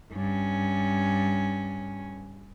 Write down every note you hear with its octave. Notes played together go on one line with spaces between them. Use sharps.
G2 C#4